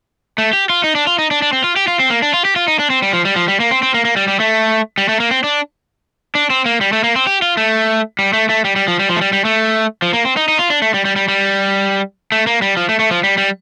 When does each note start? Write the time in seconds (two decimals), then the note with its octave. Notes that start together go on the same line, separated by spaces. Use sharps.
0.38 A3
0.53 G4
0.70 F4
0.84 D#4
0.95 D4
1.07 F4
1.19 D#4
1.31 D4
1.42 D4
1.53 C4
1.64 F4
1.76 G4
1.88 F4
2.00 C4
2.10 A#3
2.23 D4
2.34 F4
2.45 G4
2.56 F4
2.68 D#4
2.79 D4
2.90 C4
3.02 G3
3.13 F3
3.25 G3
3.36 F3
3.48 G3
3.60 A#3
3.71 C4
3.83 C4
3.94 A#3
4.05 A#3
4.16 G3
4.28 G3
4.40 A3
4.98 G3
5.09 A3
5.20 A#3
5.31 C4
5.44 D4
6.35 D4
6.50 C4
6.66 A#3
6.81 G3
6.93 A3
7.04 A#3
7.16 C4
7.27 G4
7.42 F4
7.57 A3
8.19 G3
8.33 A3
8.50 A3
8.65 G3
8.76 G3
8.88 F3
8.99 G3
9.10 F3
9.16 A3
9.21 G3
9.33 G3
9.45 A3
10.02 F3
10.13 A#3
10.25 C4
10.37 D#4
10.48 D#4
10.59 F4
10.70 D4
10.82 A3
10.94 G3
11.05 G3
11.16 G3
11.28 G3
12.32 A3
12.47 A#3
12.62 G3
12.77 F3
12.89 A3
12.99 A3
13.11 F3
13.24 G3
13.38 G3